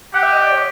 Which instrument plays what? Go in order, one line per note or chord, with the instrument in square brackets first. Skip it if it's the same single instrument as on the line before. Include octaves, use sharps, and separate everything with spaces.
[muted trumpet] G4 [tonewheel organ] F#5
[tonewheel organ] E5
D#5
D5
C#5